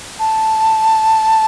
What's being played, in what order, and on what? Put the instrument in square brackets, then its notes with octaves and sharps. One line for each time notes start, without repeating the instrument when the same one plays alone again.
[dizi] A5